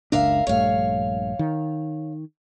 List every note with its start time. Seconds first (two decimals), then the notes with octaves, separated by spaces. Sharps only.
0.12 F#1 C#2 D4 A#4 E5 F5
0.47 A#1 G2 A3 C#5 F5
1.39 D#3